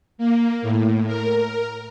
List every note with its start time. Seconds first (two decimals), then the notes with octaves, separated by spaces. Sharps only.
0.18 A#3
0.62 A2
1.06 A#4